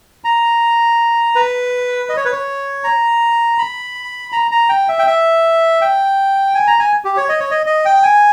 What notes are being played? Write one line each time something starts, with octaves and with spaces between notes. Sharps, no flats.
A#5
B4
D#5
C#5
B4
C#5
A#5
B5
A#5
A#5
G5
E5
G5
E5
G5
G#5
A#5
G#5
G4
C#5
D#5
C#5
D#5
D#5
G5
G#5